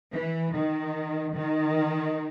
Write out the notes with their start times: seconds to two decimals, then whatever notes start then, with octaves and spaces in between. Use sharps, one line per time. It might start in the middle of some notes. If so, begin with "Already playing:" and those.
0.12 E3
0.53 D#3
1.33 D#3